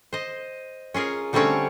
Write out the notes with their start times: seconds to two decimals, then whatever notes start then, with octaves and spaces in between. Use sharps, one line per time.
0.13 C5 D#5
0.94 C#4 F4 G#4 A#4
1.33 D3 G3 A3 C4 C#4 C#5